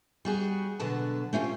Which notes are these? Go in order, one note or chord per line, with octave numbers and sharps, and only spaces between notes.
G3 F#4 G#4
B2 D3 F#3 B3 A5
A3 C#4 F4 G4